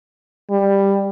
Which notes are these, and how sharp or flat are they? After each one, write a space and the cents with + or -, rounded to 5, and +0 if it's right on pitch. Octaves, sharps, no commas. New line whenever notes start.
G3 +10